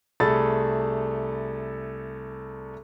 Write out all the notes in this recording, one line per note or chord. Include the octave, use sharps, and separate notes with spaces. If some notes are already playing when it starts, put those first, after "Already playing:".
C2 A3 G#4 A4 B5 A6